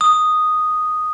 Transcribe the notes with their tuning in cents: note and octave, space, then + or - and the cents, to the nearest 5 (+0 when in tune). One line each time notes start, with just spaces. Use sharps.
D#6 -5